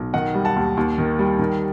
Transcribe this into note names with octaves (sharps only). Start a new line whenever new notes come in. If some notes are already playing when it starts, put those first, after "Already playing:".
Already playing: B1
D#3 D#5 F#5
G3
F#5 A5
D#2
D#2
D#3
G3
D#3